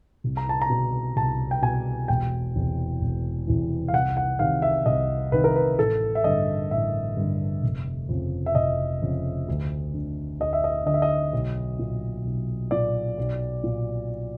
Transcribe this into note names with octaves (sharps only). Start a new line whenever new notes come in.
C2
A#5
A5
A#5
B2
C2 A5
G5
B2 G#5
E1 G5
E2 C3 E3
E1
E2 C3 E3
F5
C2 F#5
F#5
C3 D#3 F5
E5
C2 D#5
C3 D#3 B4
A#4
B4
A1 A4
E5
G2 D3 D#5
A1 E5
G2 D3
F1
F2 C#3
E5
F1 D#5
F2 C#3
D2
D3
D2 D#5
E5
D#5
D3 D#5
E5
D#5
B1
A#2
B1
A#2 D5
B1
A#2